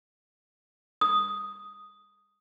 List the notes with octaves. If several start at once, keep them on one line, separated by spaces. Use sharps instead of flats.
D#6